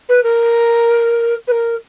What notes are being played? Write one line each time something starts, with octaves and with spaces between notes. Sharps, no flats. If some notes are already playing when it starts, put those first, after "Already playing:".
B4
A#4
B4
A#4